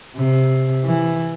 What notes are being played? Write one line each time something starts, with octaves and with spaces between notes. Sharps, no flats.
C3
E3